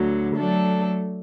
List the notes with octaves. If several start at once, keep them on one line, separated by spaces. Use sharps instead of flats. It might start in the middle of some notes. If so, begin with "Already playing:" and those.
Already playing: D2 D3 F#3
F#3 A3 D4 A4